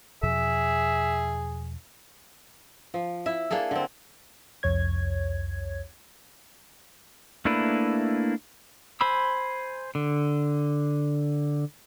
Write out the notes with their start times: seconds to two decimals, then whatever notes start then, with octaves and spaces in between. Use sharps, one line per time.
0.23 E2 B2 F3 G#4 E5
2.94 F3
3.26 E4 E5
3.51 A#3 D4 G#4 A4
3.71 D3 C4
4.63 C2 F2 C#5 G#6
7.45 A3 A#3 D4 E4 B4
9.01 C5 G#5 B5 E6
9.95 D3